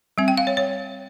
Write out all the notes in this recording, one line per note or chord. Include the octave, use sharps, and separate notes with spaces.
G3 C4 E5
G5
F5
C#5
C#5